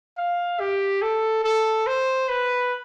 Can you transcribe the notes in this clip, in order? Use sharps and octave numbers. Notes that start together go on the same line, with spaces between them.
F5
G4
A4
A4
C5
B4